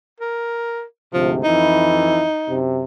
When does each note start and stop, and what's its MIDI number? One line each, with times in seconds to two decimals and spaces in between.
0.20 0.83 70
1.13 1.43 38
1.13 1.43 44
1.13 1.43 48
1.13 1.32 53
1.44 2.23 41
1.44 2.23 52
1.44 2.58 63
1.44 2.23 64
2.47 2.83 42
2.47 2.83 48